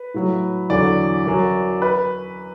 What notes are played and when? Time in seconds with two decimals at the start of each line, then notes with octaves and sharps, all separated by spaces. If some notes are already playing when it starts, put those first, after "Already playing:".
Already playing: B4
0.14 A2 F#3
0.70 E2 D3 F#3 D5
1.26 F#2 F#3
1.82 B4